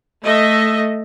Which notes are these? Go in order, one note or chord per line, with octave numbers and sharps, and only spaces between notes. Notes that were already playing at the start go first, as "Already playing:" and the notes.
A3 D#5 E5